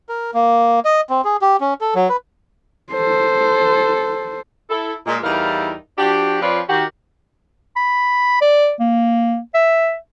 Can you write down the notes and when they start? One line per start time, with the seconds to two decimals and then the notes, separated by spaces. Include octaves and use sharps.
0.09 A#4
0.34 A#3
0.85 D#5
1.10 C4
1.25 G#4
1.42 G4
1.61 C#4
1.81 A4
1.95 F#3
2.09 B4
2.92 A4 C5
4.70 E4 A4
5.07 A#2 G#3
5.23 E2 G3 D#4 E4 A#4 F5
5.98 F3 D4 F#4 G4
6.42 F3 C4 F4 B4 C#5 D5
6.69 D#3 F#4 G4
7.76 B5
8.41 D5
8.80 A#3
9.55 E5